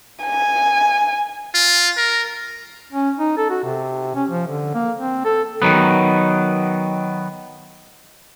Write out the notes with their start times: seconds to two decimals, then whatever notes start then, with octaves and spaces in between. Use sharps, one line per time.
0.24 G#5
1.54 F4
1.97 A#4
2.92 C#4
3.19 D#4
3.37 A4
3.50 F#4
3.64 C3
4.15 C#4
4.30 F3
4.47 D3
4.74 A#3
4.99 C4
5.25 A4
5.62 D#3 F#3 B3